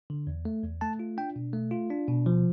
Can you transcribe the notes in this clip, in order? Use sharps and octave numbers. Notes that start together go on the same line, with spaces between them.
D3
E2
A3
E2
A3 A5
F4
D4 G5
B2
A3
F4
D4
B2
F3